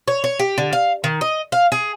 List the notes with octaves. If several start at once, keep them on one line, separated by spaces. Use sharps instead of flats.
C#5
C#5
G4
D3
F5
D#3
D#5
F5
G#4